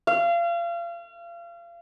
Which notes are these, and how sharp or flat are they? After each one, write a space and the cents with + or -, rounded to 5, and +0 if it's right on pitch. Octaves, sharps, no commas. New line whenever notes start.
F5 -35